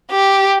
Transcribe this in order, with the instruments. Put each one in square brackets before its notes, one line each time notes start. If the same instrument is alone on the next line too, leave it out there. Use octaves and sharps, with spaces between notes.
[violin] G4